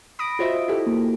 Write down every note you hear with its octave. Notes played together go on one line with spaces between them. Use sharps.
B5 D#6 A#6 D7
F4 F#4 C5 D#5 E5
E4 G4 A4
A#3